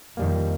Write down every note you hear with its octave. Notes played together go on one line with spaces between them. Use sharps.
F2 D#3 G3 A#3